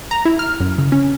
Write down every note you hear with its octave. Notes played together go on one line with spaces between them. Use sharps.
A#5
E4
F6
F#2
C#3
C#4